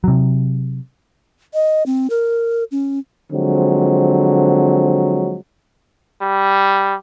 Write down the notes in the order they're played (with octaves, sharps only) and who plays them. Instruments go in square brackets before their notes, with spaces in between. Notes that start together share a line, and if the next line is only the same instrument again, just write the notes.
[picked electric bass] C3 F#3
[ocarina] D#5
C4
A#4
C#4
[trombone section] D3 F3 F#3 G#3 C4
[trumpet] G3